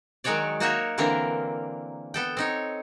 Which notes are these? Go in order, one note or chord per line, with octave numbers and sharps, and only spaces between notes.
D#3 F#3 G#3 F#4 C#5 D5
A#3 D#4 F#4 A#4 C#5 E5
D3 E3 A#3 C4 D4 A#4
B3 A4 G5
C4 D#4 C#5